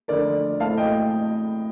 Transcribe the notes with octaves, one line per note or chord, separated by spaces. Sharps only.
F2 D3 A3 A#4 D5
A2 A3 C4 F5 A5
D#5 G5